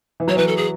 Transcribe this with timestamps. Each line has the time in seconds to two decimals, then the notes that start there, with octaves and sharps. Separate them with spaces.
0.20 E3
0.28 F#3 C#5
0.36 E3 B4
0.48 A4
0.57 G#4